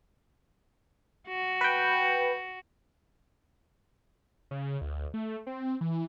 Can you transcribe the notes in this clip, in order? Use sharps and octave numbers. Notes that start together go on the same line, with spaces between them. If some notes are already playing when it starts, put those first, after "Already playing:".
F#4
B4 G5
C#3
D2
A3
C4
E3